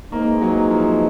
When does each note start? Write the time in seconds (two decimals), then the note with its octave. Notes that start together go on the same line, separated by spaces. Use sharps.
0.12 E3 G#3 A#3 C4 D#4
0.41 F#3
0.71 F3